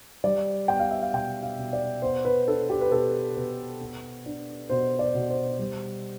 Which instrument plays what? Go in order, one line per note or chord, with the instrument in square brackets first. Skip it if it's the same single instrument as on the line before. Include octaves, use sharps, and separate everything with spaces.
[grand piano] G3 D5
B3 G5
F5
E5
F5
B2 G5
F5
B2
D5
B3 C5
B4
D4 A4
G4
B4
B2 A4
B2 B4
B3
D4
B2 C5
D5
B2
C5
G3